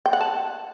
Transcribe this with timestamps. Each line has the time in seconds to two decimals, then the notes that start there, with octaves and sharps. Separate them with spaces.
0.06 G5
0.13 F#5
0.21 A5